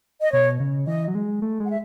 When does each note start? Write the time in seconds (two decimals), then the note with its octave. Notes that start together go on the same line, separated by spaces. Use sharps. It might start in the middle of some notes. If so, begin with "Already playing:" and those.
0.21 D#5
0.32 B2 C#5
0.60 C#3
0.87 E3 D#5
1.08 F#3
1.15 G#3
1.42 A3
1.60 G#3 F#5
1.70 E5